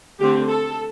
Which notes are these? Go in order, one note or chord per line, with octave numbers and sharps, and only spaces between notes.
D3 A3 C4 G4
A4